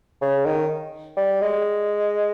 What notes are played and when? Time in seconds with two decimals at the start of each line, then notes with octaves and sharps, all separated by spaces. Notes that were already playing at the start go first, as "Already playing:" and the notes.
0.21 C#3
0.46 D#3
1.17 G3
1.41 G#3